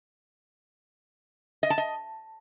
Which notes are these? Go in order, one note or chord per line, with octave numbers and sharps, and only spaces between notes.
D#5
A5
D#5